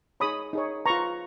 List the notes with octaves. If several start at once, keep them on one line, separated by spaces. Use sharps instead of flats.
D#4 G#4 C#5 B5 D#6
D#4 G#4 C#5
F4 B4 A#5 C#6